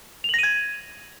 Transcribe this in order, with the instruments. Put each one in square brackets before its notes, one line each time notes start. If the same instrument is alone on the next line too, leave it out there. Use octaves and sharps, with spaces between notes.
[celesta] F7
F#7
A#6
D#7
G#6